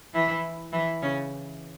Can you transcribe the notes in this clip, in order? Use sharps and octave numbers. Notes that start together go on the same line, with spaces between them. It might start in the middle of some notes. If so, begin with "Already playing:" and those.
E3 E4
E3 E4
C#3 C#4